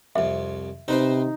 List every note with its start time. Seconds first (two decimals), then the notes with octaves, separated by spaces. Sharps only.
0.16 C2 F2 E5
0.88 C3 C4 D#4 B4 C5